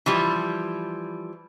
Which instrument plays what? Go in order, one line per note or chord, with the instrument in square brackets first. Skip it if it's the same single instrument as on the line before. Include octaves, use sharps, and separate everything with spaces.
[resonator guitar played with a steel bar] E3 F3 G3